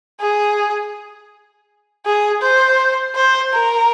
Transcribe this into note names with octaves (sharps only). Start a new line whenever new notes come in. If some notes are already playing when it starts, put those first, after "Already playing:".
G#4
G#4
C5
C5
A#4